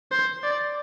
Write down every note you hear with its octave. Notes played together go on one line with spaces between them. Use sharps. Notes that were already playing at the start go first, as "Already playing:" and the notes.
C5
D5